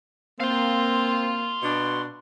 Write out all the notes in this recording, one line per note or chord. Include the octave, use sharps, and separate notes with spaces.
A#3 C4 F5 C6
B2 D4